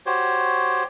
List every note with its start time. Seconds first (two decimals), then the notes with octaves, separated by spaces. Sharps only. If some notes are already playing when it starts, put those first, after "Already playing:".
0.06 F#4 G4 C5 C#5